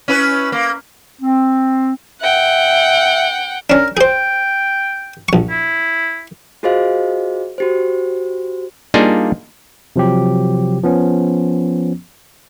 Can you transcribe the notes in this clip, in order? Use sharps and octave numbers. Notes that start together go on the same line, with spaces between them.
C#4 E4 B4
A#3
C4
E5 F#5 G5
C#4 D4 A#4
G#4 C5 G5
A#1 C#6
E4
F4 F#4 G#4 C5 D#5 F5
F#4 G4 C5
G3 A#3 D4 D#4 F4 G#4
C3 F3 F#3 G4
F3 B3 C#4